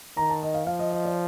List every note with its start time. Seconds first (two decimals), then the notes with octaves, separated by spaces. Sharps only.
0.17 D#3 A#5
0.30 A5
0.43 D#5
0.54 F5
0.67 F3 F5
0.79 D#5
0.92 D#5
1.05 D5